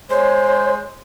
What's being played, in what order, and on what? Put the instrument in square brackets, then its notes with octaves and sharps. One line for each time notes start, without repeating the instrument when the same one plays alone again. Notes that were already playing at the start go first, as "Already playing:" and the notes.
[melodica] G#3 [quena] C5 [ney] C#5